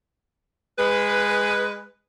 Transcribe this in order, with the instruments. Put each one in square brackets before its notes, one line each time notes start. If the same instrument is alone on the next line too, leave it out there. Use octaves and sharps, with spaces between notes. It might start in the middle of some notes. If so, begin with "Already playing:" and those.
[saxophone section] G#3 B4